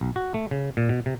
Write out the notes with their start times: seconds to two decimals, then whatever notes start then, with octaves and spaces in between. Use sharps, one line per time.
0.01 B1
0.16 F#4
0.34 A3
0.51 C#3
0.77 A#2
0.89 B2
1.06 C3